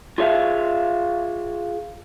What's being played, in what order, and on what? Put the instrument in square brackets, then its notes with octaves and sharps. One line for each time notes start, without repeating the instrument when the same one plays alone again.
[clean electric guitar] F4 G#4 C#5 E5 F5